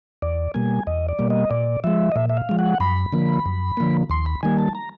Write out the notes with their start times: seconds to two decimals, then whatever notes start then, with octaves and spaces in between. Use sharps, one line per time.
0.22 E2 D5
0.54 B2 G3 A#3 G#5
0.87 E2 D#5
1.09 D5
1.19 B2 G3 A#3
1.30 D#5
1.51 A#2 D5
1.84 F3 G#3 E5
2.12 D#5
2.16 A#2 E5
2.30 E5
2.37 F5
2.49 F3 G#3
2.59 F#5
2.80 F#2 B5
3.12 D3 F3 A#3
3.46 F#2
3.77 D3 F3 A#3
4.10 D#2 C6
4.26 B5
4.43 D#3 G3 A#3 G#5
4.58 A5
4.75 A#5